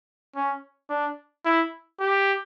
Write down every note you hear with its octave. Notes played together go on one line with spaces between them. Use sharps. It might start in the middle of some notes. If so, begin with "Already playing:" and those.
C#4
D4
E4
G4